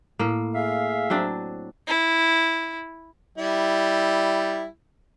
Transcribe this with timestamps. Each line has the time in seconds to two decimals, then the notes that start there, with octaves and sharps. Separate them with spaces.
0.19 A2 A#3
0.54 G#4 E5 F5
1.10 F#3 C4 D4
1.88 E4
3.38 G3 E4